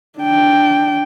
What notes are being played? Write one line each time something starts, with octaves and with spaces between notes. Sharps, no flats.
D4 G5